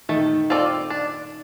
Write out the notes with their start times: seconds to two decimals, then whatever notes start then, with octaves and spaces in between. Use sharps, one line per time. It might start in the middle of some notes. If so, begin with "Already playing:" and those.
0.09 D#3 A3
0.50 C4 F4 A4 D5
0.90 D4